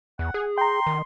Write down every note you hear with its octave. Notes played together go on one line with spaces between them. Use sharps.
E2 F#5
G#4
G5 A#5 C6
D#3